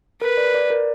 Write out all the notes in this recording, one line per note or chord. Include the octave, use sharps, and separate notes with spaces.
A#4 B4
D5
D5
A#4